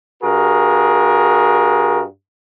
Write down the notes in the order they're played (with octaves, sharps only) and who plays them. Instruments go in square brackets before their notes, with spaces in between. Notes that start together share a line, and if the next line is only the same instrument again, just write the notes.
[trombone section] G2 F#4 G#4 A#4